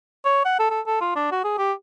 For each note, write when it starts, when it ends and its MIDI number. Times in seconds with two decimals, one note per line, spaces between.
0.25 0.42 73
0.45 0.57 78
0.59 0.66 69
0.70 0.80 69
0.87 0.96 69
1.01 1.13 65
1.16 1.30 62
1.32 1.40 66
1.44 1.56 68
1.58 1.72 67